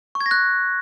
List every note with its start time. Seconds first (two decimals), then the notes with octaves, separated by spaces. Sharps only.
0.15 C#6
0.21 G#6
0.26 A#6
0.31 F#6